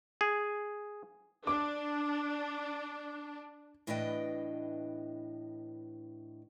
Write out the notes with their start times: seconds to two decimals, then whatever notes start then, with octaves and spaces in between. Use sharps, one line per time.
0.21 G#4
1.47 D4 D6
3.87 A2 E3 D4 B4 D#5 G5